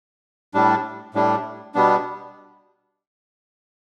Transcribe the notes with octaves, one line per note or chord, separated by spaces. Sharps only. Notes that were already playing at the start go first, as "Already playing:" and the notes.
A2 G3 D4
A2 G3 D4
B2 G3 B3 D4